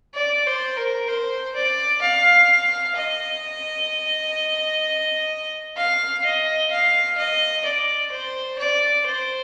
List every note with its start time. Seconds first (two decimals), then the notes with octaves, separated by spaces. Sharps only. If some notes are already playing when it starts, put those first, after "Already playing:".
0.15 D5
0.46 C5
0.77 A#4
1.08 C5
1.55 D5
2.02 F5
2.96 D#5
5.77 F5
6.24 D#5
6.71 F5
7.18 D#5
7.65 D5
8.11 C5
8.59 D5
9.06 C5